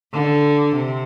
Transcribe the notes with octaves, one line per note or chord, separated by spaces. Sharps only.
D3
C3